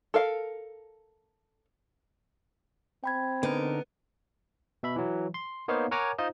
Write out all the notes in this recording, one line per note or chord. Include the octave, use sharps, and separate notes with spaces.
A4 A#4 F5
C4 G5 B5 G#6
D3 B3 D#4 A#4
B2 E5 B5
E3 F#3
C6
A#3 B3 D#4 C5 C#5 F5
A#4 C#5 F#5 G#5 A#5 D6
D#4 F4 C5 D#5